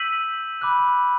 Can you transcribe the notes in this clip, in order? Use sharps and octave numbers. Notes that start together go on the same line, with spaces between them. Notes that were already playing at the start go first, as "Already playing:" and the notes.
Already playing: E6 G6 B6 D#7 F#7
B5 D6 F#6